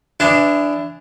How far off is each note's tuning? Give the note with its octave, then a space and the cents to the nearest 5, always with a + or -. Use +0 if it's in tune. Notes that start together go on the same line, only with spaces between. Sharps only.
E3 +20 D4 +0 D#5 +0